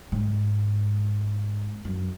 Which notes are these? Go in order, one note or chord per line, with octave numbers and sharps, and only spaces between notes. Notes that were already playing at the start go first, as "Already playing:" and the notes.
G#2
F#2